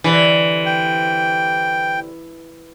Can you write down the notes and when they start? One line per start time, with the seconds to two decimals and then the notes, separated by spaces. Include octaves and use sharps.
0.04 D3 E3 G3 C4
0.66 G5